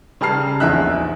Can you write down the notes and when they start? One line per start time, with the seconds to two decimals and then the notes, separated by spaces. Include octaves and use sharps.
0.21 C#3 G3 A5 A#5 F6 C7
0.60 A#1 E2 D#4 E5 E6 F#6